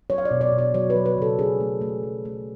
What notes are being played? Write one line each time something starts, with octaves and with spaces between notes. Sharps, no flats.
F#3 C#5
F5
D5
B2
D5
B2
D5
F#3 C#5
B4
F#3
B4
C#3 A4
C#4 G#4
A3
A3
F#3
A3